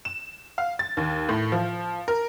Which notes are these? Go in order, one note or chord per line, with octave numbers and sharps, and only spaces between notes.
E7
F5
A6
D#2
A2
F3
A#4